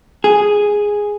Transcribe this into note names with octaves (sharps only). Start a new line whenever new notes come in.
G#4